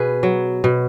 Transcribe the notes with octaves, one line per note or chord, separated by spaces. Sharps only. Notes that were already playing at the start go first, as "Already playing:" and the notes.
Already playing: B2 G#4 B4
F#3
B2